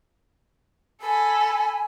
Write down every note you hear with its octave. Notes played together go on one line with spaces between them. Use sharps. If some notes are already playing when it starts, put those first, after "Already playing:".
A4 G#5 B5